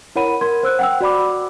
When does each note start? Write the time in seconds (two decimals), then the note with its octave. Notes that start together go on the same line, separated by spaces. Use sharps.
0.16 E4 A#4 C#5 F#5 B5 D#7
0.41 A#4 C6 G#6
0.63 C5 E6 F#6
0.79 F#5 G5 E6
1.01 F#4 D5 B5 D6